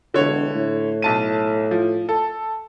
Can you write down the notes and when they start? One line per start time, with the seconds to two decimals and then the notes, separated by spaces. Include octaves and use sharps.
0.14 E1 D3 C#5
0.54 A2
1.02 B1 A5 D#7
1.71 F3
2.09 A4